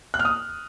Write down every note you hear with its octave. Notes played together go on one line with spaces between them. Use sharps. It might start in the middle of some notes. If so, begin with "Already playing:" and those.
F#6
F6
D#6